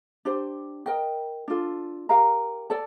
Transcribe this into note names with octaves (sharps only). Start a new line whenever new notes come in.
D4 G4 C5
A#4 D#5 G5
D4 F4 A4
G4 A#4 F5 A#5
A4 D5 A5